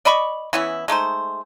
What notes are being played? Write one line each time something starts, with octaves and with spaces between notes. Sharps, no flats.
D5 D#5 B5 C#6
E3 B3 C#4 E4
G#3 A3 D#4 C5